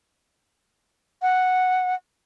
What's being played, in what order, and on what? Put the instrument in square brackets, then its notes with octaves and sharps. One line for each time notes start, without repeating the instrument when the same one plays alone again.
[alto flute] F#5